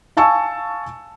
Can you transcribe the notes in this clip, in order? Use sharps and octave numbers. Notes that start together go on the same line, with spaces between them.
F5 G#5 A5 C#6 E6